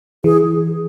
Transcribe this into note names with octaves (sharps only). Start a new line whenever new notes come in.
E3 G#4